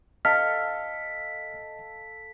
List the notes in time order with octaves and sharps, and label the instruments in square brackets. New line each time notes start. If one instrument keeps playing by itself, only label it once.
[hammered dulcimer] A4 F5 [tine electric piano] D#5 [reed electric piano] F6 [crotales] B6